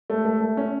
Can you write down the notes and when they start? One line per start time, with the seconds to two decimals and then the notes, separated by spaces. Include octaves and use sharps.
0.10 A3
0.25 A3
0.40 A3
0.57 C#4